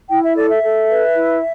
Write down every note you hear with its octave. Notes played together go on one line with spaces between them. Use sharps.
E4 G5
E5
A4 D5
E5
A4
B4
E4